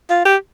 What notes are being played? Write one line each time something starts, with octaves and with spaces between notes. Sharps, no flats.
F4
G4